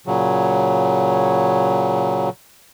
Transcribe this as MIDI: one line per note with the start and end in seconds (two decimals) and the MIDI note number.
0.06 2.29 46
0.06 2.29 49
0.06 2.29 54